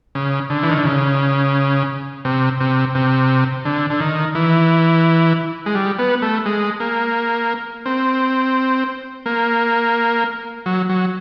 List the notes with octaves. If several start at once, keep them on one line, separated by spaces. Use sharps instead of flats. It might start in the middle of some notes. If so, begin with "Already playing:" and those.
C#3
D3
E3
D#3
D3
C#3
C3
C3
C3
D3
D3
D#3
E3
G#3
G3
B3
A3
G#3
A#3
C4
A#3
F#3
F#3